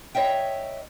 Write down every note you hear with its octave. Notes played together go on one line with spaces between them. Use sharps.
C#5 D#5 E5 G5